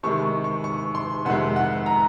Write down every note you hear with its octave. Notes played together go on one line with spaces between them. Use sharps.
C3 D#3 G#3 C#6
C#6
C#6
C6
F2 C3 D#3 G#3 F#5
F#5
A#5